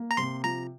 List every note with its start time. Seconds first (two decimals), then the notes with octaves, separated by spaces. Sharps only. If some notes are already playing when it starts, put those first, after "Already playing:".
Already playing: A#3
0.11 A#5
0.17 C3 C6
0.44 F3 A#5